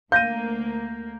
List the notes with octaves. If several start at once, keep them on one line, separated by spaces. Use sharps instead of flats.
D2 A#3 F5 G6 A#6 D#7